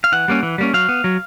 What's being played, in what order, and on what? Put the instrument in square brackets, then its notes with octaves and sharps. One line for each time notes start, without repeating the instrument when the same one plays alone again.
[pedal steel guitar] F5
E3 F#5
G3 A#3 C#4
E3
G3 A#3 C#4
F#3 F5
B3
F#3